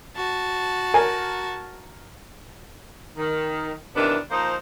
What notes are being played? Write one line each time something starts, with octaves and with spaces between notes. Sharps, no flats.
F#4 A5
A#4 G#5
D#3
C3 D#3 E3 B3 D4
F3 A#3 D#4 C5